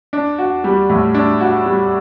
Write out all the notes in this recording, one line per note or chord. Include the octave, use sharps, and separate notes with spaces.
D4
F#4
G3
A2
D4
F#4
G3